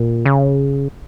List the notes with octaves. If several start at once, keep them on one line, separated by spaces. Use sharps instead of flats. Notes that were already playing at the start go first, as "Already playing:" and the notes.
Already playing: A#2
C#3